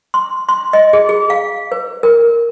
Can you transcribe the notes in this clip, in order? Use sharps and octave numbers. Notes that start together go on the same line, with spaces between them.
C6
C6
D#5
G#4
G#4
F5
B4
A#4